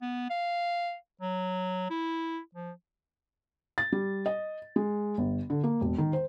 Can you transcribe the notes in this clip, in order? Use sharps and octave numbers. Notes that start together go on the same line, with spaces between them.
B3
F5
F#3
E4
F3
A6
G3
D#5
G#3
G1
D3
A#3
E1
D#3
C5